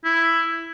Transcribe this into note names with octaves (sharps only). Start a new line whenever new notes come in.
E4